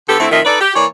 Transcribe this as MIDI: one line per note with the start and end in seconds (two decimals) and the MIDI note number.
0.08 0.19 50
0.08 0.19 59
0.08 0.19 67
0.08 0.19 69
0.20 0.28 50
0.20 0.28 57
0.20 0.28 60
0.20 0.28 64
0.32 0.40 41
0.32 0.40 45
0.32 0.40 51
0.32 0.40 65
0.32 0.40 75
0.32 0.40 76
0.45 0.60 63
0.45 0.60 69
0.45 0.60 71
0.45 0.60 74
0.61 0.72 67
0.75 0.85 52
0.75 0.85 58
0.75 0.85 73
0.75 0.85 74